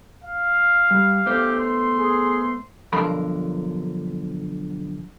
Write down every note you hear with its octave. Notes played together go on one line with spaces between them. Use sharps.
F5
G3
A3 B3 G4 C5
C6
G#4
B1 G2 D3 F3 A#4 B5